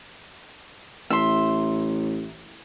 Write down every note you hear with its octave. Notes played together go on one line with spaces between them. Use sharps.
A1 E5 C6